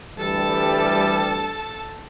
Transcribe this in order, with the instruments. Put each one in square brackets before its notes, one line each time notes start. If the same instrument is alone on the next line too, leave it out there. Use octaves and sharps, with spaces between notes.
[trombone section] D2 E3 G3 [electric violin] A4 A5